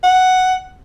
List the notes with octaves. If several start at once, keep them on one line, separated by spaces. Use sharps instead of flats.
F#5